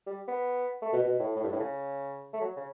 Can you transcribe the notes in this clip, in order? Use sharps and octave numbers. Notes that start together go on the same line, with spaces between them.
G3
B3
A3
B2
B2
A2
A2
G2
A2
C#3
A3
F#3
C#3